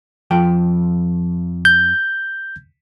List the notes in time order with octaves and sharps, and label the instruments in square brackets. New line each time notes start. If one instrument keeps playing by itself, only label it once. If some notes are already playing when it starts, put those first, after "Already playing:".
[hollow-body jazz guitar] F2 F3 G5
[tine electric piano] G6